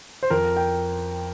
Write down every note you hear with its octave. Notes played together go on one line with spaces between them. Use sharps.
C5
F2 A#4
G5